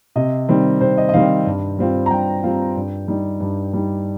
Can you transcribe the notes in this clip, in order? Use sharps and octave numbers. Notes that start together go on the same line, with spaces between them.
C3 D#5
D#3 G3 C4
C3 C5
D#5
D#5
D#3 G3 C4 F5
G2
G3 C4 F4
A#5
G2 G5
G3 C4 F4
G2
G3 D#4
G2
G3 D#4